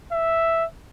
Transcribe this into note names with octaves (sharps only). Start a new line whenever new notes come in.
E5